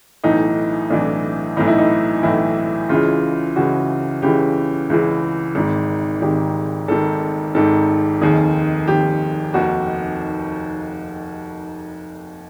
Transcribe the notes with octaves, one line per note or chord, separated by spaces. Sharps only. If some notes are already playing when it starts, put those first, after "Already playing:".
B1 A2 E3 D#4
B1 A2 E3 D4
B1 A2 E3 D#4
E4
D#4
B1 A2 E3 E4
C#2 C#3 E3 F4
C#2 C#3 E3 F#4
C#2 C#3 E3 G4
C#2 C#3 E3
G#1 G#2 D#3
G#1 G#2 D#3 G4
G#1 G#2 D#3 A4
G#1 G#2 D#3 A4
F1 D#2 D#3 G#4
F1 D#2 D#3 G4
F1 D#2 D#3 F#4